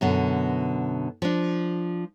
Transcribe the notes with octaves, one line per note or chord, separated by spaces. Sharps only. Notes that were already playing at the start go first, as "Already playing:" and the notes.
F#2 B2 D3
F3 D4